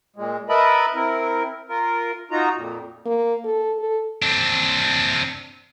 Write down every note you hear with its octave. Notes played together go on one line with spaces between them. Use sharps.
A#2 G#3
A#4 B4 D#5 E5 A5 B5
C4 E4 A#4
F4 A#4
D#4 F4 F#4 A#5
F2 A#2
A#3
A4
A4
C4 D4